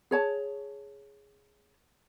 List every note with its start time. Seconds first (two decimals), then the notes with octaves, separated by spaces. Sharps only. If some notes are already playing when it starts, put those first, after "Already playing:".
0.11 G#4 C#5 A5